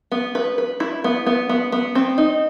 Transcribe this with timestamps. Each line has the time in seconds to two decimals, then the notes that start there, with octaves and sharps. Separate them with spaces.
0.12 B3
0.35 B4
0.58 B4
0.80 E4
1.04 B3
1.26 B3
1.49 B3
1.72 B3
1.95 C4
2.18 D#4